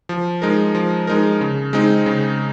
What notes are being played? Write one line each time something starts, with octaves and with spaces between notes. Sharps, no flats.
F3
G#3 D#4 A#4
F3
G#3 D#4 A#4
C#3
G#3 C4 D#4
C#3